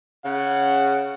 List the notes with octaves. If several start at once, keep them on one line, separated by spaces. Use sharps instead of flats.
C#3 F#5